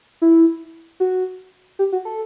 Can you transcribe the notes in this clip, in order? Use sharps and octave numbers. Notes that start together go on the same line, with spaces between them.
E4
F#4
G4
F#4
A4